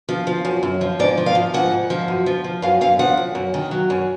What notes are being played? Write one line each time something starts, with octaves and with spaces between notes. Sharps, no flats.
F3
F3
F#2
F#2
F3
G#2 D5
F3
F5
F3
G#2 F#5
G#2
F3
F#2
F3
F3
F#2 F5
F#2 F5
F3 F#5
F#2
F#2
D#3
F#3
F#2